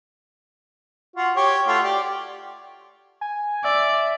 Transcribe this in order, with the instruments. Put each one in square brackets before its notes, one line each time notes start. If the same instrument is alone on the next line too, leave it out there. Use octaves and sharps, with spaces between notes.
[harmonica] F4 F#4
G4 C#5
A3 F4 F#4
G4 D5
[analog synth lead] G#5
[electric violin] D5 [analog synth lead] E5